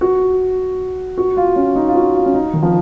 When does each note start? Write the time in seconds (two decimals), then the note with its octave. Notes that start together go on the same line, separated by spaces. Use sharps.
0.01 F#4
1.18 F#4
1.37 F4
1.56 C#4
1.75 D#4
1.88 F4
1.95 F#4
2.14 F4
2.26 C#4
2.34 D#4
2.53 D#3
2.63 F3